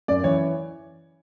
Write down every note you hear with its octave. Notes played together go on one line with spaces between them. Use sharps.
F#2 D5
E3 C#5